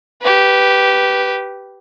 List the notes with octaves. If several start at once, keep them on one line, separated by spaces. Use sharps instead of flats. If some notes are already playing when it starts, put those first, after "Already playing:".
G4 B4